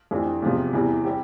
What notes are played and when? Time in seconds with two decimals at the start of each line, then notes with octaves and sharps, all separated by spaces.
0.11 F2 E3 A3 D4 G4
0.42 E2 C3 F3 C4
0.73 E2 C3 E3 G3
1.04 G3 C4 G4